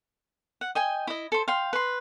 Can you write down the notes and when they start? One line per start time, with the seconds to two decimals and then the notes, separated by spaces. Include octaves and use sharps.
0.61 F#5
0.75 D#5 G5 G#5
1.07 E4 D#5
1.32 A4 C5
1.48 F5 G5 C6
1.73 B4 C6